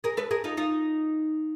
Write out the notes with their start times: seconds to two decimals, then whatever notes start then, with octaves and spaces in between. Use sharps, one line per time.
0.04 G#4 A#4
0.17 A4 B4
0.31 G#4 A#4
0.44 D#4 F4
0.57 D#4 F4